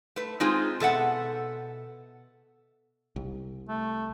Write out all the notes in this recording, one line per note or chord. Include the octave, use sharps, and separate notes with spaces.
A3 B4
G#3 C4 D#4 F4 G#4
B2 A4 E5 F#5
C2
A3